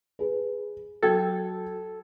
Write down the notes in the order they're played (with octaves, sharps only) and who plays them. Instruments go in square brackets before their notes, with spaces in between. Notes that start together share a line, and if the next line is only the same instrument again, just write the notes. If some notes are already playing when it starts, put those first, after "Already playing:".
[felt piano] G#4 B4
[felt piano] F#3 G5 G#6 [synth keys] A4